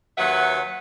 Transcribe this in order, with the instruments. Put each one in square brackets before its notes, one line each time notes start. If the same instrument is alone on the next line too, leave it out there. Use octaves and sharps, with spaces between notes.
[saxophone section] D#2 F#3 B4 E5 F#5